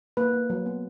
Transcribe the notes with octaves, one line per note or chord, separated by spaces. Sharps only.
A#3 B4
A#3
F#3
B3